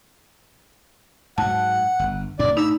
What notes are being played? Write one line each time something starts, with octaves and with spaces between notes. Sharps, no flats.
G#2 F#3 F#5 A5
G1
A2 D4 D5
D#4 B5 E6